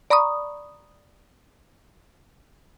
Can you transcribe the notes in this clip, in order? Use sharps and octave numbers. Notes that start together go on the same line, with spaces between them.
D5 A#5 B5 C#6 D#6